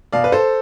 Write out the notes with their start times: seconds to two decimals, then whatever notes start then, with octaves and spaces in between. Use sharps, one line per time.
0.12 B2 D5 F5
0.24 B4
0.32 A4 C5